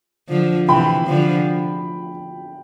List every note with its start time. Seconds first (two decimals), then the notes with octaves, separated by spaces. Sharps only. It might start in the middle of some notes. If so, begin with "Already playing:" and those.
0.29 D3 F3
0.68 C3 E3 G5 B5
1.07 D3 F3